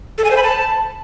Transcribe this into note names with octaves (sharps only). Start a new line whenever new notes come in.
A4
G#5
C5
B5
A5